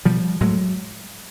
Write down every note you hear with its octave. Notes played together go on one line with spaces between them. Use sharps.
B2 F3 G3
A2 F#3 G#3